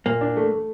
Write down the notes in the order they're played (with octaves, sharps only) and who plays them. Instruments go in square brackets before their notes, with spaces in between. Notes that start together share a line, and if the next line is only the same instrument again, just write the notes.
[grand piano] A#2 [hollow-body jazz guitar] A#3
[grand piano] D4
A3
A3